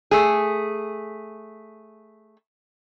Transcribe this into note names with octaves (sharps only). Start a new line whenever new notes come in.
A3 G#4